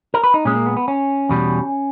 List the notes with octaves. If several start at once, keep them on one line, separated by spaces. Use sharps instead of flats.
A#4
B4
D#4
A#2 G#3 C#4
A#3
B3
B3
C#4
E2 B2 G3